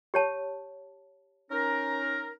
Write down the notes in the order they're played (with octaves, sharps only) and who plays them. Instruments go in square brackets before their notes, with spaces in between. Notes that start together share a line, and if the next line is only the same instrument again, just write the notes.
[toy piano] G4 C#5 A5
[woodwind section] C#4 D#4 A#4